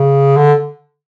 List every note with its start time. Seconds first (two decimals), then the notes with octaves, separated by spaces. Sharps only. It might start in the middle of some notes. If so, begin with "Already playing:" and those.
Already playing: C#3
0.37 D3